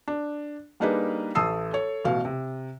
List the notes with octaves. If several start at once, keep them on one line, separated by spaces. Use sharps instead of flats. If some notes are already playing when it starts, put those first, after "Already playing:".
D4
G3 A#3 D4 D#4 G#4 B4
A1 A3 A5 D#6 E6 C7
A4 C#5
A1 B2 F5
C3